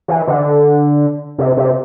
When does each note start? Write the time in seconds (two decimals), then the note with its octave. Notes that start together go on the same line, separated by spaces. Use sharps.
0.08 E3
0.27 D3
1.38 C3
1.57 C3